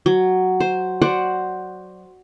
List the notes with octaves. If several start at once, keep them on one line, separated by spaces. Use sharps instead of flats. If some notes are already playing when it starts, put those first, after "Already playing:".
F#3
C5
F#4 C5 D5 F#5